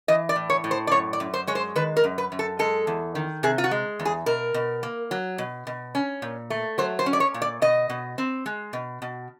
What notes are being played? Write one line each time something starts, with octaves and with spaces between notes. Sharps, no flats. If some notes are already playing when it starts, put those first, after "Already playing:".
E3 D#5
D5
A2
C#5
A2
C5
D5
F#2 C#5
D5
F#2
C5
G#3 C#5
C5
D#3 B4
A#4
F#2
B4
F#2
A4
G#3 A4
E2
D#3
C3 G#4
F4
F#4
G#3
E2
G#4
B2 A#4
B2
A#3
F#3
B2
B2
C#4
A#2
A3
F#3 C5
C5
C#4
D5
C#5
A#2
D5
B2 D#5
B2
C4
G#3
B2
B2